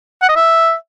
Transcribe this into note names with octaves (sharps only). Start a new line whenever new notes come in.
F#5
D#5
E5